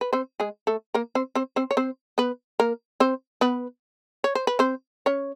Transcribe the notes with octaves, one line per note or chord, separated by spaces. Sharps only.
B4
C4 C5
G#3 G#4
A3 A4
A#3 A#4
C4 C5
C4 C5
C4 C5
C#5
C4 C5
B3 B4
A#3 A#4
C4 C5
B3 B4
C#5
C5
B4
C4 C5
C#4 C#5